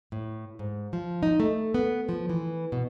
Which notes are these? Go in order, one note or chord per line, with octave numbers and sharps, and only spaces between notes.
A2
G#2
F3
D#4
A3
B3
F3
E3
B2